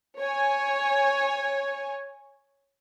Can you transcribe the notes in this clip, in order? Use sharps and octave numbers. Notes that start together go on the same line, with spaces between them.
C#5 G#5